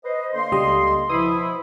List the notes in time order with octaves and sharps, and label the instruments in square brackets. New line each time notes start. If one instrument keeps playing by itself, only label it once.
[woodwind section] B4 C5 D#5
D3 A#3 C6
[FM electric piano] C#2 G3 D#5
[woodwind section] B2 F3 E4 [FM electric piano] B5 C6 D#6